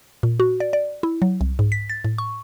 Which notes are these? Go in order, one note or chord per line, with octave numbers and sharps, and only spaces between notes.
A#2
F#4
D5
D5
E4
F#3
C2
G#2
B6
A6
A2
C#6